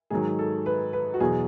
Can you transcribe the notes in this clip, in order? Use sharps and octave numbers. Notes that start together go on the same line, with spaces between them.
G#2 D#3 F#3 G#4
A4
B4
B4
F#4
E2 B2 F#3 G#4